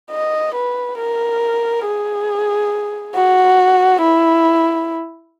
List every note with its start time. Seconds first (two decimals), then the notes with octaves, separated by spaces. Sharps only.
0.11 D#5
0.55 B4
0.98 A#4
1.85 G#4
3.15 F#4
4.02 E4